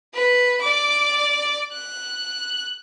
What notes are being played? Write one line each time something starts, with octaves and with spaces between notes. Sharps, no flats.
B4
D5 D6
F#6